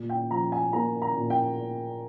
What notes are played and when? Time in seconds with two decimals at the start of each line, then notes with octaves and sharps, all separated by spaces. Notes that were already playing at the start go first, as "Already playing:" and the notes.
Already playing: A#2
0.09 G5
0.31 F3 A#5
0.52 G#5
0.73 A#3 A#5
1.02 A#5
1.16 A#2
1.30 G5